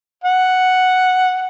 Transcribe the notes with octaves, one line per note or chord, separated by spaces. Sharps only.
F#5